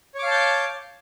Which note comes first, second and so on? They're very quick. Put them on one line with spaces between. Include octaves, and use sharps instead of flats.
C#5 D6 F5 A5 G6